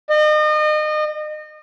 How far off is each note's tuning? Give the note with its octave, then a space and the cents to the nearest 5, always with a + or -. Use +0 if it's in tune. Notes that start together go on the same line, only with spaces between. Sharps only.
D#5 -35